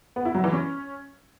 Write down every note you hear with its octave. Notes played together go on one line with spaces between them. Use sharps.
B3
E4
F#3
E3
C#4